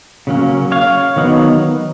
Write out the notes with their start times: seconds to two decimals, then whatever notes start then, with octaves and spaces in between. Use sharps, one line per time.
0.27 C#3 F#3 A#3 C#4
0.72 C#5 F5
1.16 D#3 F#3 B3 D#4